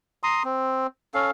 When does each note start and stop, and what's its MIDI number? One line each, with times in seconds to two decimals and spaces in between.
0.23 0.43 82
0.23 0.43 84
0.23 0.43 87
0.45 0.87 60
1.14 1.31 61
1.14 1.31 69
1.14 1.31 77